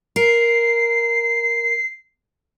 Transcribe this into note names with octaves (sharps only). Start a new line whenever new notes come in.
A#4 C7